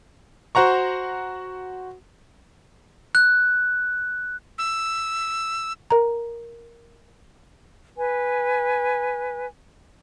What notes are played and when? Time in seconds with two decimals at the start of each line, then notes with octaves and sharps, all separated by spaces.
0.55 F#4 C5 F#5 A#5 C#6
3.15 F#6
4.58 E6
5.90 A#4 A#5
7.97 B4 G#5